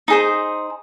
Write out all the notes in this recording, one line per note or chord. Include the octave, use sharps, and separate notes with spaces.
D#4 G#4 C5